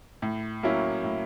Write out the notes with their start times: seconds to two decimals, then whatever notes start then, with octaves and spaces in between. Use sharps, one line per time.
0.22 A2
0.63 F#3 A#3 C#4 E4
1.04 A2